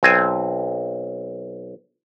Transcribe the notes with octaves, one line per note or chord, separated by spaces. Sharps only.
B1 C4 G#5